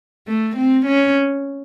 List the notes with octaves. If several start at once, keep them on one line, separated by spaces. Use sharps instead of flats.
A3
C4
C#4